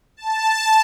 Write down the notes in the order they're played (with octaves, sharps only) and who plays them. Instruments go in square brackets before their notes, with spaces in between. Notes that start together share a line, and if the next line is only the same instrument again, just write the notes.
[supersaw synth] A5